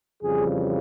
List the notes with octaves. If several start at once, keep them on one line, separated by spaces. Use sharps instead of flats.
F2 C#3 E3 G3 G#4